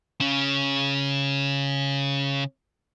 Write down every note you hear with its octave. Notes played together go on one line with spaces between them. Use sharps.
C#3 C#4